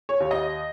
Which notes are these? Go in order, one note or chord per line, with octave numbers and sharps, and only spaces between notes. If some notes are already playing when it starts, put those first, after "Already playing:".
C#5
D#2
D#5